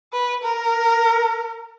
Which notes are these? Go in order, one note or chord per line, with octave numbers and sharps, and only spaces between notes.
B4
A#4